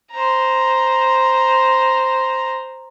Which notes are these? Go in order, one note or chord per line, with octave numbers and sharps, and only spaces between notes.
C5 A#5